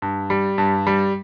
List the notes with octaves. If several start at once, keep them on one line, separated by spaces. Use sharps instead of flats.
G2
G3
G2
G3